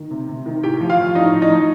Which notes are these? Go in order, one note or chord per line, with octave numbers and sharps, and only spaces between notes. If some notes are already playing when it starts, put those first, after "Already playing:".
Already playing: D#3
C3
C3
D#3
A2 G4 G5
F3
F4 F5
F3
A2 D#4 D#5
A2
D#4 D#5
F3